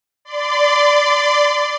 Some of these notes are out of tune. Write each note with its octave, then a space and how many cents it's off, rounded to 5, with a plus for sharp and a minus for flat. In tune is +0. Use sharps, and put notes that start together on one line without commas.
D5 +0 C6 -35